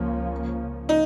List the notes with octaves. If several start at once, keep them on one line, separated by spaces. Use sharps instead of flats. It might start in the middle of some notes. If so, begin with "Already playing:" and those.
Already playing: C#2 C#3 F3 A#3 C#4
D#4